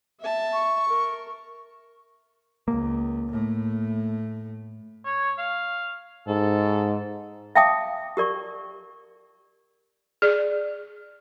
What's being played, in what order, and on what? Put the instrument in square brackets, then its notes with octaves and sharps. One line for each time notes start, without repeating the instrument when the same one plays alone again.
[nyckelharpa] E5 A5
[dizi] C#6
[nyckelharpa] A#4
[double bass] C#2 [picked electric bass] A#3
[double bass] A2 A3
[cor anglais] C#5
F5
[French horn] G#2 [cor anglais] A4
[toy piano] E5 F5 G5 A5 D6 D#6
G4 A#4 D5 C#6
[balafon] G#4 D5